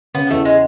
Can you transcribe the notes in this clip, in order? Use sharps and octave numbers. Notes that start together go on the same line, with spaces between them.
C#3 B3
E2 A3
G#3